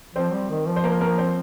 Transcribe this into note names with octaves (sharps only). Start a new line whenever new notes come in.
F3 C4 C5
G3
D#3
F3
C5
A#3 A#4
A#3 A#4
C4 C5